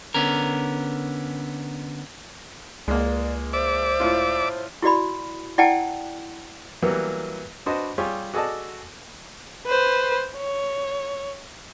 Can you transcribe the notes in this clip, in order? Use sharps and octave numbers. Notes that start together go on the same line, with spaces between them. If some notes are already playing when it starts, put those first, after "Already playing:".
D3 B3 C#4 A#4
C#2 G#3 A#3 D5
C5 D5 E5 D6
A2 F4
E4 F#4 D5 B5
E4 D5 F#5 G5 A5
E3 F#3 G3 A#3 B3
D4 F#4 B4 C5 D#5
G3 F4 G4 G#4 C#5
F#4 G#4 A4 D5 D#5 A5
B4 C5
C#5